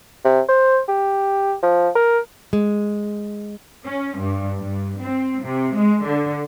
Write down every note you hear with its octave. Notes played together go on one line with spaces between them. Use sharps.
C3
C5
G4
F3
A#4
G#3
C#4
G2
G2
C4
C3
G#3
D3